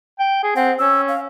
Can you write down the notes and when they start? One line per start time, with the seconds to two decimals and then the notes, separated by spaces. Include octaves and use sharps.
0.19 G5
0.43 G#4
0.56 C4 F#5
0.79 C#4 E6
1.08 F5